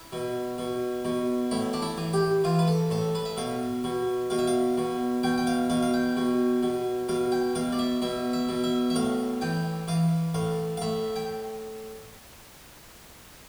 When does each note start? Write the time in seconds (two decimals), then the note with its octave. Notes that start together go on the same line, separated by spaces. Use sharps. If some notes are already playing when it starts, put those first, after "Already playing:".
Already playing: E4
0.13 B2
0.58 B2
1.05 B2
1.51 A2 E4
1.73 D4
1.82 E4
1.97 E3
2.13 G4
2.44 E3 F4
2.59 B4
2.68 A4
2.90 A2 A4
3.15 B4
3.25 E5
3.37 B2 F5
3.84 B2
4.30 B2 F5
4.39 E5
4.47 F5
4.78 B2
5.23 B2 G5
5.38 G5
5.47 F5
5.70 B2 F5
5.83 F5
5.94 G5
6.17 B2
6.63 B2
7.09 B2 F5
7.32 G5
7.55 B2 F5
7.72 D5
7.79 E5
8.02 B2 E5
8.33 E5
8.49 B2
8.64 E5
8.90 E5
8.95 A2 F5
9.41 E3 G5
9.88 E3 F5
10.34 A2 F5
10.77 F5
10.82 A2 E5
11.16 G5